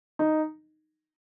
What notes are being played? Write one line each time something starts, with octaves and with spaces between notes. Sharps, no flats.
D#4